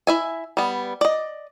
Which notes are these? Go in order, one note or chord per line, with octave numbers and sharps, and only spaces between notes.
E4 E5 G#5
G3 B3
D5 D#5